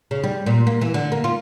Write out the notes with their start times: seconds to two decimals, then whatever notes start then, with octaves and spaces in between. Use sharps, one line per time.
0.11 C#3
0.24 G3
0.46 A#2
0.67 A#3
0.81 E3
0.94 D3
1.12 A#3
1.24 F4